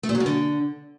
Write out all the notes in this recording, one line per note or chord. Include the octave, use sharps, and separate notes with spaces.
A3
A#2
F#3
C#3
D3